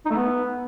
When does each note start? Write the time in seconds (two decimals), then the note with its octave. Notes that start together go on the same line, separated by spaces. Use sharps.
0.06 D#4
0.11 A3
0.16 B3